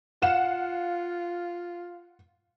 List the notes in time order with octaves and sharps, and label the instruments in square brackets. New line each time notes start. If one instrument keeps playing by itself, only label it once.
[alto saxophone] F4 [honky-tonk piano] F5 F#5 E7